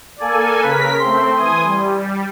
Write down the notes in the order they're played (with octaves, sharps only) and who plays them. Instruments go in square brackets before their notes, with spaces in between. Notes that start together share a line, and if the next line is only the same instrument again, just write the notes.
[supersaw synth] A#3 A4 G#5 [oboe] D5
[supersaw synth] C#3 A#4 B6 [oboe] B4
[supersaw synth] A3 C4 [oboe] C6
[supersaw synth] E3 G#5 D#6
G3